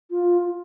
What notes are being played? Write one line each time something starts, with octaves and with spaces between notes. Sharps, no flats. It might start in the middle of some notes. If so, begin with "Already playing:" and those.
F4